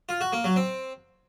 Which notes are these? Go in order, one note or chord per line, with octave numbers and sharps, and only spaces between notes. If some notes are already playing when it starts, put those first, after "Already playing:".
F4
F#4
A#3
F#3
C4